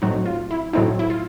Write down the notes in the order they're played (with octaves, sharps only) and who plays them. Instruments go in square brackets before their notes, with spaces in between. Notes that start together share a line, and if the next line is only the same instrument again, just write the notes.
[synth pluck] A2 F#3 A3 C4 D#4 F#4
F4
E4
A2 F#3 A3 C4 D#4 E4
E4
F4